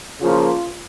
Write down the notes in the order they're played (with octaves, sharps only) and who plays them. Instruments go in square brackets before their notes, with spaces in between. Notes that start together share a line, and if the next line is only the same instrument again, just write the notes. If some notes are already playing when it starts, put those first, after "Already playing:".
[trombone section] C#3 F3 A#3 F4